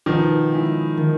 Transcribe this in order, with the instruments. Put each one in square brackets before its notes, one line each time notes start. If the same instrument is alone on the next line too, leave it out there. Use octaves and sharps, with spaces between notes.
[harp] B2 [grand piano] D#3 F3
[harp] G#3 C#4 E4
D#3